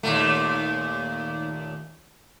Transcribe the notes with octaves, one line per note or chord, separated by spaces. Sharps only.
D#2 A#2 A3